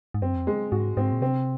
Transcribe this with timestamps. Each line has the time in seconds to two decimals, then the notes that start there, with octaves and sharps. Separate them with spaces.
0.14 G#2
0.22 F#2 C4
0.35 F2
0.47 G#3
0.72 G#2 F#4
0.97 G#2 C4
1.12 A#2
1.21 C3 C4